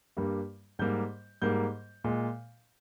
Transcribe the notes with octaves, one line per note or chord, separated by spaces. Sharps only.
G2 G3 A#3
G#2 G3 A#3 G6
G#2 G3 A#3 G6
A#2 G#3